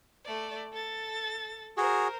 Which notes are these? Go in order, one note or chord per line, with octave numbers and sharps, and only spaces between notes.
A3 D5
A4 A6
F#4 G#4 A#4 C5